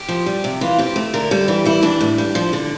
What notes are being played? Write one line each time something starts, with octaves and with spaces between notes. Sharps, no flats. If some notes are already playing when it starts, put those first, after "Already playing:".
Already playing: G4
F3
G3
C3
E3 F4
C3 G4
A3
D3 A#4
G3 A4
E3 G4
G3 E4
E3 D4
A2
G3
F3
D3